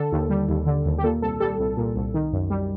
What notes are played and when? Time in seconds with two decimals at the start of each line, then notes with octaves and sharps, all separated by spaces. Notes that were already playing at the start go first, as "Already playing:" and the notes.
Already playing: D3 A4
0.12 D#2
0.30 G3
0.49 D#2
0.66 D3
0.85 D#2
0.98 G4
1.03 A#2 A4
1.22 C2 A4
1.40 G3 A4
1.59 C2
1.77 A#2
1.96 C2
2.14 D#3
2.33 F#2
2.50 G3